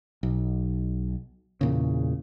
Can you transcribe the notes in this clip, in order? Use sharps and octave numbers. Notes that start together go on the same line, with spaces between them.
B1
E2 A#2 C#3